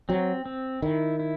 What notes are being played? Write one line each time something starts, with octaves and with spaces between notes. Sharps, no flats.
F#3 C4
C4
D#3 E4
E4